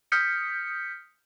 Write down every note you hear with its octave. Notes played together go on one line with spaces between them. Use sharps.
D#6 F6 G6 B6 C#7